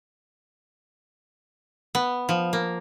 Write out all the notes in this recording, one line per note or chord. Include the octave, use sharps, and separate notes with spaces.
B3
F3
A#3